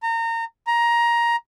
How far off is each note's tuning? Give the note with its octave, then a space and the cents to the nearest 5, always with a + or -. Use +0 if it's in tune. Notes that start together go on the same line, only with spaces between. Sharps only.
A#5 -30
A#5 +15